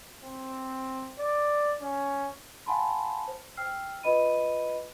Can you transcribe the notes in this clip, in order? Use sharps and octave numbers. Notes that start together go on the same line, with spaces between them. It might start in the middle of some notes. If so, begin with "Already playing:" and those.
C4
D5
C#4
F5 F#5 G#5 A5 B5 C6
C5
G5 E6 F6 C7
F4 B4 D#5 B5 D#7